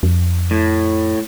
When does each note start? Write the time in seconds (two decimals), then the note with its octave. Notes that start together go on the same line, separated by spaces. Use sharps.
0.03 F2
0.51 A2